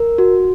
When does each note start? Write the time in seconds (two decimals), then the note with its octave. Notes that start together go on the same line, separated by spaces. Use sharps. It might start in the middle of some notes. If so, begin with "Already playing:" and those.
Already playing: A#4
0.18 F#4